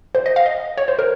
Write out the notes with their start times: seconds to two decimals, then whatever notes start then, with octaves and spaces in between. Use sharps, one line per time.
0.15 C5
0.26 D#5
0.36 F5
0.46 D#5
0.78 C#5
0.88 C5
0.99 A#4